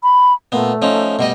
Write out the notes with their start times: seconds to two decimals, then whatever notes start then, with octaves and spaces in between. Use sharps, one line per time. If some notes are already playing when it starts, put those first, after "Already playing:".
0.03 B5
0.52 A#2 A3 B3
0.82 F3 C#4 D#4
1.19 B2 G3 D#5